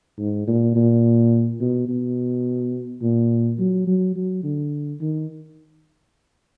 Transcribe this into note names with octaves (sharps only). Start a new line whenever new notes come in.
G#2
A#2
A#2
B2
B2
A#2
F#3
F#3
F#3
D3
D#3